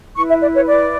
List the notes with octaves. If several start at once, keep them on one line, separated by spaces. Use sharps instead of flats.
E4 B4 C#6
E5
D5
C#5
D5